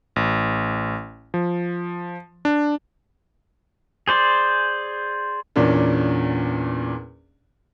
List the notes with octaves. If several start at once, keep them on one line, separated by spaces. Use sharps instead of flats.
A1
F3
D4
G#4 C5 D5
E2 A#2 A#3 C#4 D4